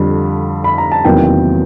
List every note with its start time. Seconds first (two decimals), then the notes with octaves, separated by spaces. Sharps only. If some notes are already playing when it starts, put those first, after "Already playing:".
Already playing: F2 D3 G3
0.64 B5
0.78 A#5
0.92 A5
1.05 E2 C3 D#3 F#3 A#3 G5